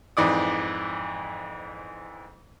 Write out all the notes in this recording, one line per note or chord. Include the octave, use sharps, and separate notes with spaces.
F2 G#2 E3 D5 D#6